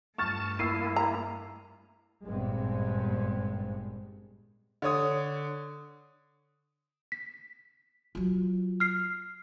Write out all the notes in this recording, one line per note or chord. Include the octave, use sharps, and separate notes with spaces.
G2 A3 A5 C#6 F6 A6
A#3 E4 E6 C7 D#7
A#5
G#1 G2 A#2 G#3 B3 C4
D3 C#5 D#6
B6
F#3 F4
F6 C7